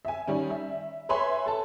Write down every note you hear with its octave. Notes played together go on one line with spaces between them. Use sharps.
E5 G#5
D#3 G3 C#4
E5
B4 C#5 E5 G#5 B5 C6
A4 A5